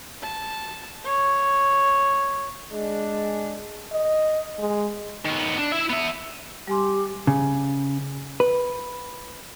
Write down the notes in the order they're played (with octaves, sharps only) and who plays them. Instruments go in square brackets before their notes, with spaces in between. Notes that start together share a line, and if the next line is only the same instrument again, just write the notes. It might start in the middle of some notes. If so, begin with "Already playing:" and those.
[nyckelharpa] A5
C#5
[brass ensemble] G#3 D4
[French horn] D#5
G#3
[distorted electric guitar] D#3 B3
D4
E4 E5
B3 E5
[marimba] G3 G#5 C6 [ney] G4
[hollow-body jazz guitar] C#3
B4